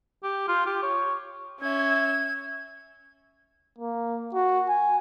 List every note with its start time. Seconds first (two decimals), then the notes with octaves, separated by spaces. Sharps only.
0.23 G4
0.48 F4
0.67 G4
0.83 C#5
1.61 C#4 E5 G#6
3.79 A#3
4.34 F#4
4.69 G#5